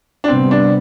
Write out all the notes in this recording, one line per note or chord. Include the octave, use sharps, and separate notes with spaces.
D4
C3 G3 B3 C4
D4